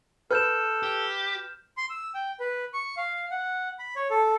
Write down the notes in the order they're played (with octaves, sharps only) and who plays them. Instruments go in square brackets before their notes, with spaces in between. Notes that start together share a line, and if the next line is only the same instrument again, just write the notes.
[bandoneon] A4 [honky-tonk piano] B4 [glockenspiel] F6 G6 E7
[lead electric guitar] G4
[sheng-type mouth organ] C6
E6
G5
B4
C#6
F5
F#5
B5
C#5
A4